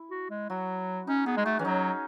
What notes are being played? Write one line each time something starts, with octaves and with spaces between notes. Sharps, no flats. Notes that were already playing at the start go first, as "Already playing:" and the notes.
Already playing: E4
F#4
G#3
F#3 F#4
C#4 D#4
B3 G#4
G#3
A3 F#4
E3 C#4
F#3 D#4